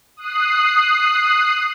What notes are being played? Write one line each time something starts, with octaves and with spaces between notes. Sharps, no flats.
D#6 F#6 C7